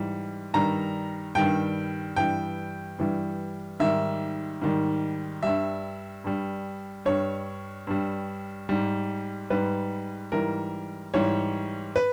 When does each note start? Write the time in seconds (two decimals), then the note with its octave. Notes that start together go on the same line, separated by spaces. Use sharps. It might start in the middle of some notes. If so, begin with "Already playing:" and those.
Already playing: G#2 E3 G3
0.54 G2 D#3 G3 A#5
1.35 G2 D#3 G3 G5
2.16 G2 E3 G3 G5
2.98 G2 E3 G3
3.80 G#2 D#3 G3 E5
4.62 G#2 D#3 G3
5.43 G2 G3 E5
6.24 G2 G3
7.05 G2 G3 C#5
7.87 G2 G3
8.69 G#2 G3
9.50 G#2 G3 B4
10.32 G#2 E3 G3 A#4
11.14 G#2 E3 G3 C#5
11.96 B4